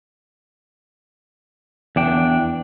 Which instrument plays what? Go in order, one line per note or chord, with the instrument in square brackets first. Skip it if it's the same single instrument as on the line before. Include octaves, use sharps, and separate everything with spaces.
[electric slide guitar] E2 D4 G5